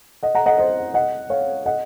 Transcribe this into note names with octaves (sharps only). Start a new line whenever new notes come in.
D#5 F#5
F#5 A#5
D#5 F#5
C5 D#5
D#5 F#5
C#5 F5
D#5 F#5